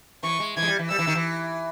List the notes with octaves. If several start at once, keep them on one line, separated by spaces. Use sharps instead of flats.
E3 C#6
G#3
E3 G#6
G#3
G3
E3
G3 E6
E3
D#3
E3